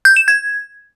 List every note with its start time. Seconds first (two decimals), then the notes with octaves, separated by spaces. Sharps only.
0.05 G6
0.16 E7
0.28 G#6